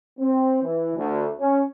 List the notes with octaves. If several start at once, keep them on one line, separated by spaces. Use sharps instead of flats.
C4
E3
D2
C#4